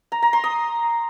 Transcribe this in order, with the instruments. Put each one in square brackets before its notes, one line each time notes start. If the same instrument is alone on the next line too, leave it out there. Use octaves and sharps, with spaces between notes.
[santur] A#5
A#5
C6
D#6